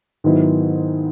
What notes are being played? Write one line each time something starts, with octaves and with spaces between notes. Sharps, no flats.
G#2 D#3 F#3 B3 E4